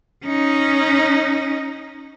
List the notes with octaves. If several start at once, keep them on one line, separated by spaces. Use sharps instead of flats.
C#4 D#4